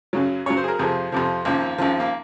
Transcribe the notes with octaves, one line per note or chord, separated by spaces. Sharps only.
F#2 C#3 F#3
F#2 C#3 F#3 C#5
C5
G#4
A#4
F2 C3 F3 G#4
F2 C3 F3
G#1 F#2 F3 A#3
G#1 F#2 F3
A#3